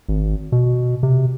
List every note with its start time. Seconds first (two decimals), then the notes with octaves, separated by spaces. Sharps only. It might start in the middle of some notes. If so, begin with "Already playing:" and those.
0.08 G#1
0.52 B2
1.03 C3